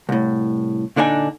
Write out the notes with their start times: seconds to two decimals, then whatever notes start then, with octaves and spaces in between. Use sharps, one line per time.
0.09 C2 A2
0.96 A#2 D3 D4 D#4 G#5